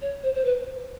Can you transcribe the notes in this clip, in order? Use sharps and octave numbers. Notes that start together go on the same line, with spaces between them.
C#5
C5
C5
B4